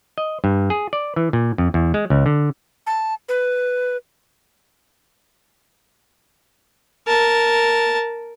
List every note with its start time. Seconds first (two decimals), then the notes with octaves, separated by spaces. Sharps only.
0.18 D#5
0.44 G2
0.70 G#4
0.93 D5
1.16 E3
1.33 A#2
1.58 F2
1.74 E2
1.94 G#3
2.10 C#2
2.26 D3
2.87 A5
3.29 B4
7.07 A#4 A5